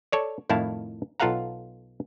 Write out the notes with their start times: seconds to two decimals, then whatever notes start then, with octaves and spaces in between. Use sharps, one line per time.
0.12 A4 C#5 D5
0.49 F2 A2 D#3 E4 F5 A5
1.20 B1 F4 A4 F5 F#5 A#5